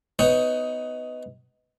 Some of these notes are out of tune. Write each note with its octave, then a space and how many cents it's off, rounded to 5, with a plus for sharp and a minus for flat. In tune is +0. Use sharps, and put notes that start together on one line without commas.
B3 +20 D#4 +15 C#5 +0